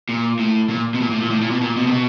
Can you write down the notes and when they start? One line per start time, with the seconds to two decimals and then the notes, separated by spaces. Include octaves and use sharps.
0.09 A#2
0.39 A2
0.69 A#2
0.94 B2
1.01 A#2
1.11 A2
1.20 A#2
1.31 A2
1.41 A#2
1.51 B2
1.61 A#2
1.76 B2
1.87 C3
1.92 B2